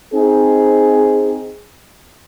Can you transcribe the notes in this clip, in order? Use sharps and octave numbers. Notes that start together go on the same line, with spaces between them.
C4 D#4 G#4